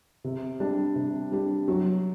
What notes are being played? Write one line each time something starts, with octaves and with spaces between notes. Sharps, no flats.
C3
G3 D4 G4
C3
G3 D4 G4
F#3